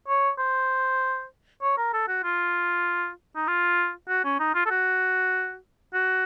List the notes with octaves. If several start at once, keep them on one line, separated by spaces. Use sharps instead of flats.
C#5
C5
C#5
A#4
A4
F#4
F4
D#4
F4
F#4
C#4
D#4
F4
A4
F#4
F#4